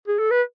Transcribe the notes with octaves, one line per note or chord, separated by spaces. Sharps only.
G#4
A4
B4